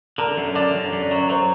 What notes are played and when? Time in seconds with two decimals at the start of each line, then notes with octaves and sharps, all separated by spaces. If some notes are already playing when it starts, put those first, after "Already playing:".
0.18 D3 A#4
0.37 F#2
0.55 D3 D5
0.75 F#2
0.92 F#2
1.02 D5
1.11 F#3 C#5
1.30 F#3 C5